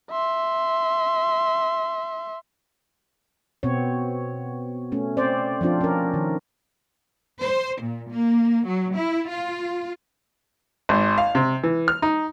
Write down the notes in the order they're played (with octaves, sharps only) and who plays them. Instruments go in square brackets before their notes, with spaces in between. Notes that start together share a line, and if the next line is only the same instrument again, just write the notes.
[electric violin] E5 C6
[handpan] B2 B3 C4 C#5
A3 C#4
C4 C5 D5
F3 C4 D4 F4
C#4 A#4
D#3
[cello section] C5
A#2
A#3
F#3
E4
F4
[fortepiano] G#1
F5
C3
E3
F6
D#4